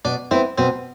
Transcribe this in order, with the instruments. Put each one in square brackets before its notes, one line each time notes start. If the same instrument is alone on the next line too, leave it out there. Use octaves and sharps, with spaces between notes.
[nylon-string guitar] B2 [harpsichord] D4
[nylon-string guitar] B3 E4 [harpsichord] C4
[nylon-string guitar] B2 [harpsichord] C4